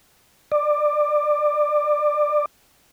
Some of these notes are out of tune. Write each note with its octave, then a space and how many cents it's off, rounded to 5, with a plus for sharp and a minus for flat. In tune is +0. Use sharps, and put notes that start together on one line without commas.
D5 +20